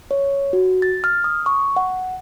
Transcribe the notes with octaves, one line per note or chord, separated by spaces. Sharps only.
C#5
F#4
A6
F6
D#6
C#6
F#5